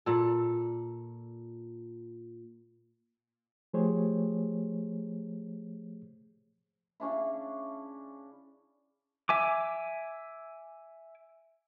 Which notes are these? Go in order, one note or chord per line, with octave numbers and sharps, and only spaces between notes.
A#2 A4
F3 A3 G4 G#4 C5 C#5
C#3 C#4 D4 E4
E5 G#5 D6